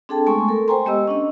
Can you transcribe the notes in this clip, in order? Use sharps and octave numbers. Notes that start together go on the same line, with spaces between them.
C4 D4 G#4 A4 G5 A5
G#3 A3 B3 G#5 C6 C#6
A4 A#4
C5 G5 G#5 A#5 C6
G#3 B3 G4 D#5 E6
C#4 D4 D#5